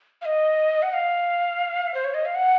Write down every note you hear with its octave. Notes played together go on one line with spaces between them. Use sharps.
F5
D#5
F#5
F5
C5
C#5
D#5
F5
F#5